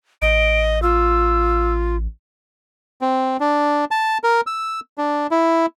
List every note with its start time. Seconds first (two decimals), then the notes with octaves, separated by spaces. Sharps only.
0.22 A1 D#5 D7
0.82 F4 E6
3.01 C4
3.40 D4
3.91 A5
4.24 A#4
4.47 E6
4.98 D4
5.31 E4